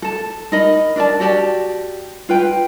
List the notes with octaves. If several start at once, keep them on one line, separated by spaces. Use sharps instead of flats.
A4 A5
D#4 A#4 D#5 B5
D4 A#4 D5 A5
F#4 G4 D5 A5
F4 B4 G5